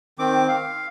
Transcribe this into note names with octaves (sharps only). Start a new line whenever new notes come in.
D#3 C4 D6
F5